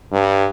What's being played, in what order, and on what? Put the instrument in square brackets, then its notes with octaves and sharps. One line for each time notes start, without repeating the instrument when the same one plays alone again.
[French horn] G2